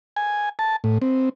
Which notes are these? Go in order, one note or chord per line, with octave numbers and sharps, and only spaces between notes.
G#5
A5
A2
C4